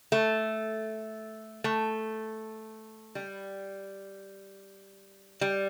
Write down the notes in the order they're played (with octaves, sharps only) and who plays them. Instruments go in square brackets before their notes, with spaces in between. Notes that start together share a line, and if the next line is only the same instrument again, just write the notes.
[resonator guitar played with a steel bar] A3
A3
G3
G3